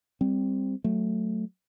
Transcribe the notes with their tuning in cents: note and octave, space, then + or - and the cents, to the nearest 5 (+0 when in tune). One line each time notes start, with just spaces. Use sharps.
G3 +10 C4 +0
F#3 +0 A3 +0